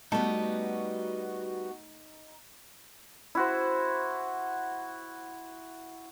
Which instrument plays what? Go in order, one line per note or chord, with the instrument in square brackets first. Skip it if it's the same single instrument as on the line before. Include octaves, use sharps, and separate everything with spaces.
[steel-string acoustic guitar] G3 B3 [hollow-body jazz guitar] A3 A5 [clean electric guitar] D#4 [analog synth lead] F#4
[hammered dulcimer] E4 F#4 C5